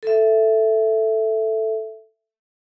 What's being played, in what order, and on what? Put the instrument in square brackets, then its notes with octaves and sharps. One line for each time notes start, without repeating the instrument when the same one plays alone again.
[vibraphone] A4 E5